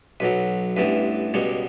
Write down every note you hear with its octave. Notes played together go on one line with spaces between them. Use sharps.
B1 B2 F#3 B4
A1 G2 E3 B3 B4
C#2 B2 G3 B3 C#5